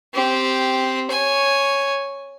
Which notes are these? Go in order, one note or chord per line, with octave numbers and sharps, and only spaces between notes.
C4 G4
C#5 G#5